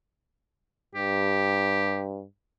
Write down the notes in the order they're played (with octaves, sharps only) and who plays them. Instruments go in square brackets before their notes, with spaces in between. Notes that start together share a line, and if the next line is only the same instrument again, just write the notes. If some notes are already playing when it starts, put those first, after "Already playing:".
[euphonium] G2 [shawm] G4